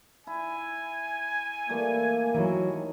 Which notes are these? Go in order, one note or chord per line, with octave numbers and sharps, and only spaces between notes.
E4 G#5
E3 G3 A3 A#3
D#3 E3 F#3 E4 C#5